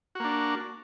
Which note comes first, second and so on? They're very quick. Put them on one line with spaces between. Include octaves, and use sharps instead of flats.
F#4 A#3 D4